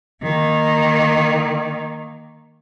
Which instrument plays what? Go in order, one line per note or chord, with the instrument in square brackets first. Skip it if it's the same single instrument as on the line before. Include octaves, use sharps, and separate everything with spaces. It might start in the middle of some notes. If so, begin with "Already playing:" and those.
[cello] D#3 A#3